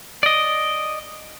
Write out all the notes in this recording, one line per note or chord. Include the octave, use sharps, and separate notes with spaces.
D5 D#5